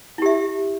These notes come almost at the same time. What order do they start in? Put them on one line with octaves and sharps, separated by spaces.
E4 G4 E5